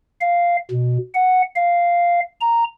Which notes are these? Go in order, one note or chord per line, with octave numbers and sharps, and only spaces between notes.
F5
B2
F#5
F5
A#5